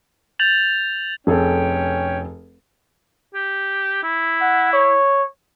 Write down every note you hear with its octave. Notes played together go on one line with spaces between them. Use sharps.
G6 A6 F7 F#7
F1 C#4 G#4 A4 G5
G4
E4
F#5
C#5